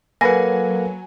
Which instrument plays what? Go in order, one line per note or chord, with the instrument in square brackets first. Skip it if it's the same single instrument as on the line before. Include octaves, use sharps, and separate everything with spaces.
[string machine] F#3 [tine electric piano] A#3 A4 F#5 [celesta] B4 B5 A#6 [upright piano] G#5